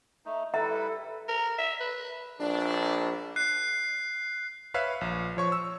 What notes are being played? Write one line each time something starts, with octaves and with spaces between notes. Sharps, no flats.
A3 D#4
G3 E4 A4 B4 E5 A#5
A#4
E5
B4
A#1 D4
F#6 C7
B4 C#5 E5 F5
A#1
F3 C#5 C#6
E6